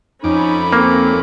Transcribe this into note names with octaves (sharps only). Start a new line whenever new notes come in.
F2 C#4 D#4 A4 B5 D6
A#3 C4